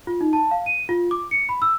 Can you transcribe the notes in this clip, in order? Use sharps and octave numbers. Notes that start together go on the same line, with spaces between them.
F4
D#4
A5
F5
D#7
F4
D6
C#7
B5
E6